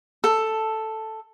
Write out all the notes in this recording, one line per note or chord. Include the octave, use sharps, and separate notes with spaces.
A4